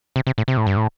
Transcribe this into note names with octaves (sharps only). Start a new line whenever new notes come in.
C3
C3
A2
C3
A2
G2
A2